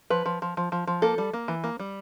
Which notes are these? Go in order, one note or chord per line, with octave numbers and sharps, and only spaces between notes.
F3 B4
F3
F3
F3
F3
F3
A#3 A4
G3
A#3
E3
A#3
G3